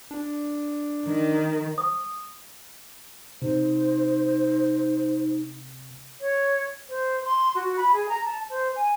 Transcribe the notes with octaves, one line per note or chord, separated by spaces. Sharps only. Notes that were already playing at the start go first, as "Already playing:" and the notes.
D4
D#3
D#6
C3 D#4 C5
C#5
C5
C6
F#4
B5
G#4
A#5
A5
C5
G#5